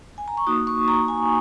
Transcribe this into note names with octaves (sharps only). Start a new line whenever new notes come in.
G#5
A#5
C#6
A#3 D#4 F#4 D#6
C#6
A#5
G#5